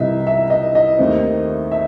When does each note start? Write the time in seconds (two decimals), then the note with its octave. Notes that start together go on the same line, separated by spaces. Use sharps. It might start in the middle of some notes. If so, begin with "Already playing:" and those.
Already playing: C2 C3 E3 D#5 E5
0.27 E5
0.50 D#5
0.75 D#5
0.99 D#2 D#3 A3 C4
1.71 E5